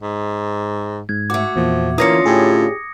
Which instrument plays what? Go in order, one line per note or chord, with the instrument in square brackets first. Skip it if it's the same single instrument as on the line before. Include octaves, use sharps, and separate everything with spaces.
[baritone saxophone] G#2
[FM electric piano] G#2 [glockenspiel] G#6
[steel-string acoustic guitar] A3 F#4 [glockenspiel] D6
[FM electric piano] E2 A#2 [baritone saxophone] F3
[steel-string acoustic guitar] D3 C#4 F4 [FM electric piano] E3 [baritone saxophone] A#3 [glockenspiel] D#6 A#6 C#7
[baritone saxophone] A2 [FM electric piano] G4 G#4